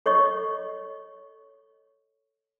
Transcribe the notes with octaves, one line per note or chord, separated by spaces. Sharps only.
A4 C#5 D#5 C#6